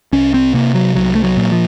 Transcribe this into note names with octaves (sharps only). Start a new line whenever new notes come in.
C2 C#4
C4
C3 A#3
F#3
C2 F#3
A3
F#3
A#2
F3